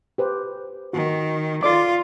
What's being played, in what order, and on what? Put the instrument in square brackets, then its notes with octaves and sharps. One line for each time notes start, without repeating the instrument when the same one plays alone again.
[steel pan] G4 B4 C5
[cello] D#3 [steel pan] F#4
[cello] F4 [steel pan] A4 D5 D6